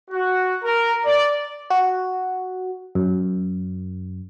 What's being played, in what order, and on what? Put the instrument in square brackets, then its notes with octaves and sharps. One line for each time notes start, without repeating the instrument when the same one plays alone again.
[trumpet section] F#4
A#4
D5
[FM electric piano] F#4
F#2